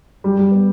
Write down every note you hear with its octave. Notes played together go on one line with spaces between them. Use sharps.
G3
G3
B3